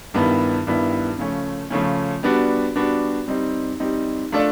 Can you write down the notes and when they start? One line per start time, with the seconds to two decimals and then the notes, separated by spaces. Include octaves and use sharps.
0.14 G2 D#3 G3 B3 E4
0.67 G2 D#3 G3 B3 E4
1.19 C#3 F3 A3 C#4
1.70 C#3 F3 A3 C#4
2.23 G3 B3 D4 F#4
2.76 G3 B3 D4 F#4
3.28 G3 C4 D#4
3.80 G3 C4 D#4
4.32 A3 D4 F4 A4 D5